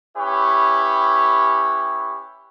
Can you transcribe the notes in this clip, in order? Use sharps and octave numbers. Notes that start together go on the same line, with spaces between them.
C#4 E4 G4 B4 C#5